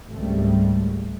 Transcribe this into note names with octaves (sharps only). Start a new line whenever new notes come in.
G#1 C#2 G#2 C#3 G3 A3